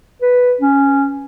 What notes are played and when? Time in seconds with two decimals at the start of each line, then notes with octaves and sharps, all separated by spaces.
0.22 B4
0.61 C#4